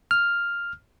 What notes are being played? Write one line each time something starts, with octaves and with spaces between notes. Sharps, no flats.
F6